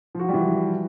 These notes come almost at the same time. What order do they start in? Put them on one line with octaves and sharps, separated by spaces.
F3 F#4 F4 G3 E3